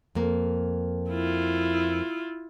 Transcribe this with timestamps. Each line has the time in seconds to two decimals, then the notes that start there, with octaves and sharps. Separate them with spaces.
0.15 F2 A#3
1.10 E4 F4